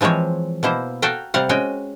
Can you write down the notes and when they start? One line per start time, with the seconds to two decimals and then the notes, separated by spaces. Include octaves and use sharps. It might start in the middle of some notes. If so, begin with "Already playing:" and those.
0.01 E3 F3 G#3 C4 C#5
0.63 B2 A#3 E4 C5
1.02 F#4 A4 F5 G5 A#5
1.34 C3 G3 F5 F#5
1.49 G#3 C#4 F#4 G5